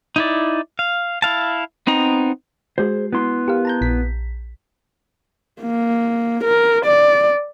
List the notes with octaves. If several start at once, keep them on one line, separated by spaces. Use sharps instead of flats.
D#4 E4 D5
F5
E4 F5 A5
B3 C4 D#4 A#5
G#3 F#4 G#4 C5
B3 E4 C6
G4 A#4 F5
A5 A#5 G6
A#1 B6
A#3
A#4
D5